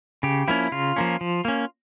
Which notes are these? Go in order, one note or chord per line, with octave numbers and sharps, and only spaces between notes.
C#3 G4
F3 A#3 C#4 E4
C#3 F4
F3 A#3 C#4
F3
A#3 C#4